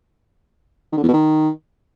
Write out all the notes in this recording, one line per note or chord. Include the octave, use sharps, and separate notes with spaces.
D#3
D3
E2
B2
D#3